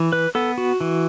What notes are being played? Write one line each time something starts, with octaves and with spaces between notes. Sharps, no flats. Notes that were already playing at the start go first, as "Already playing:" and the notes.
Already playing: E3
B4
B3 A4
F#4
E3